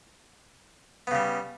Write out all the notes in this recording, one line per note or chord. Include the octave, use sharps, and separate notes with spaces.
C#3 G3 B3